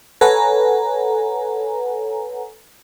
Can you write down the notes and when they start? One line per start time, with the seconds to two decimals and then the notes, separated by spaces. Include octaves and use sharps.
0.21 A4 B4 C#5 F#5 G#5 A#5